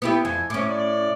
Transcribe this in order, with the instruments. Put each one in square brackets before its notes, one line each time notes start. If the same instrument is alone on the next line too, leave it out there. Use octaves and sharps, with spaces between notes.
[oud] B3 E4 G4
[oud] F2 [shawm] G#5
[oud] A2 C#4 [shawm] D6
[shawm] D5